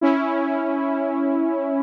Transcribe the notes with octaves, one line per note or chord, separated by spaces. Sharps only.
C#4 E4